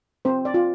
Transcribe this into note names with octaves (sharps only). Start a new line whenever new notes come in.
C4 C5
D5
F4